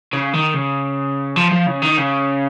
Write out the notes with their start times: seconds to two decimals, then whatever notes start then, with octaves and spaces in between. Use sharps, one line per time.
0.13 C#3
0.34 D#3
0.54 C#3
1.36 F3
1.51 F3
1.66 C#3
1.82 D#3
1.97 C#3